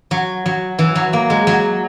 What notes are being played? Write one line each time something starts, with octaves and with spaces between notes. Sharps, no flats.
F#3
F#3
E3
F#3
A#3
G#3
F#3